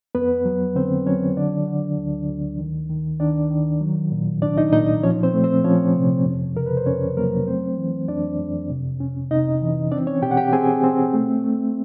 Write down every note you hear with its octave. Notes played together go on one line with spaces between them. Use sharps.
F2 B3 B4
F#3
D3 C4 C5
F#3 C#4 C#5
D3 D4 D5
D3
D2
D2
D#3
D#3
D#3 D4 D5
D#3
F#3
A#2
C2 D4 D5
D#4 D#5
A#2 D#4 D#5
F3 C#4 C#5
C4 C5
A3
C4 C5
F3 C#4 C#5
C3
F2
C#3 A#4
B4
C5
F2 C#4 C#5
F#3 A#3 A#4
A3 C4 C5
E3
F2 D4 D5
F2
C3
C#4
C3 D#4 D#5
E3
C4 D4 D5
C#4 C#5
B2 G4 G5
F#5
G4 G5
C4 G#4 G#5
C4
A3
A3